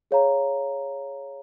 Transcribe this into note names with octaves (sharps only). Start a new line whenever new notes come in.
G#4 C#5 F5 A#5